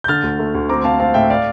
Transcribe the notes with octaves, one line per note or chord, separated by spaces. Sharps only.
G6
D3 F6 A6
D2
A3
D2
C4 A#5 D6
C4 F5 A5
C4 F5 A5
A2 E5 G5
D5 F5